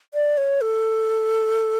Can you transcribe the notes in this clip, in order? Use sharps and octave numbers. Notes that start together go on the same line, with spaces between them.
D5
C#5
A4